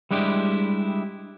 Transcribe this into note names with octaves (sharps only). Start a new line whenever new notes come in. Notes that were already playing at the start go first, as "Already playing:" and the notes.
G3 G#3 D4 E4 G4